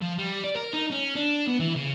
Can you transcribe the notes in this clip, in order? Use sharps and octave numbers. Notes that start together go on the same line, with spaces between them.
F3
G3
D5
A#4
D#4
C#4
D4
B3
E3
C#3